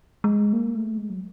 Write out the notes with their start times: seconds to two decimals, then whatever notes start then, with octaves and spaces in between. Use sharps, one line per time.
0.24 G#3
0.53 A#3
0.75 A3
0.97 G#3
1.10 F#3